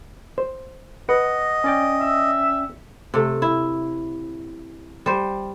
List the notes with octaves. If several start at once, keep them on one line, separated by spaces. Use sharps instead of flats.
C5
B4 D#5 F#5
C#4 D5 G5
E5
C3 A3
E4
G3 C5